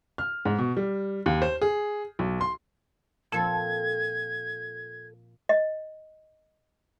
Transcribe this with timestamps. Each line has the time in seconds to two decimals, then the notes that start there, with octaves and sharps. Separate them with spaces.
0.18 F6
0.45 G#2
0.59 B2
0.77 G3
1.26 D#2
1.42 C5
1.62 G#4
2.19 B1
2.41 C6
3.32 A#2 F3 C4 A4 G#6
5.49 D#5